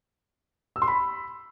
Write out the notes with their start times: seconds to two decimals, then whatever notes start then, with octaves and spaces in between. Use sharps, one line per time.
0.76 E6
0.82 C6
0.88 B5